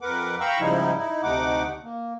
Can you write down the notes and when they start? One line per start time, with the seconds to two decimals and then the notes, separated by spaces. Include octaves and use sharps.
0.01 F2 A#4 B4 F#5 D6
0.40 F5 G5 A#5 B5 C#6 E6
0.59 G#2 C#3 F3 G3 D#4 E4
0.98 D#4 E4
1.23 D2 C3 A3 D#4 F#5 D6
1.84 A#3